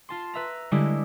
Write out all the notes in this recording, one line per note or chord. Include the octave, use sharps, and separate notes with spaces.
F4 A5 C6
B4 E5 A#5
D3 G3 G#3 E4 G4